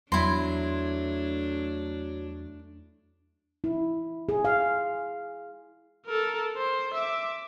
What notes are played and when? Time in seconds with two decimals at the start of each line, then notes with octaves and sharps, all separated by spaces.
0.12 E2 F#3 A3 D4 E4 C6
3.64 E4
4.29 G#4
4.45 F5
6.06 A4 A#4
6.57 C5
6.94 E5 D6